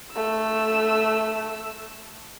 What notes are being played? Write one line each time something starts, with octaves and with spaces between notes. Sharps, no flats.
A3 E6